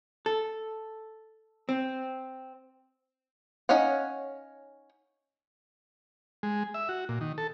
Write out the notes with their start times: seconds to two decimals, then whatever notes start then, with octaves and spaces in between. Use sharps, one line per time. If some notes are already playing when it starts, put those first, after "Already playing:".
0.26 A4
1.69 C4
3.69 C#4 D#4 C#5 F5 F#5
6.43 G#3
6.74 E5
6.89 F#4
7.09 A#2
7.21 D#3
7.38 A4